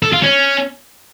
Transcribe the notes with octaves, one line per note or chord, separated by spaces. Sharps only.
A4
F4
C#4